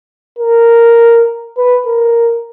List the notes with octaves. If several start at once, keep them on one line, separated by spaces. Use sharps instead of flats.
A#4
B4
A#4